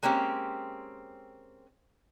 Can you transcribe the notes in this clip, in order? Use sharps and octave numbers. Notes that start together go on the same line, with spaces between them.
G#3 A#3 C4 C#4 G4